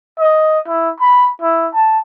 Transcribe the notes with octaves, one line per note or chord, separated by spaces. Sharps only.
D#5
E4
B5
E4
A5